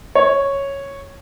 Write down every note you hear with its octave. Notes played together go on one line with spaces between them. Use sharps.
C#5